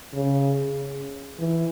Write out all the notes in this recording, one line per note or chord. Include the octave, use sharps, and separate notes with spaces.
C#3
E3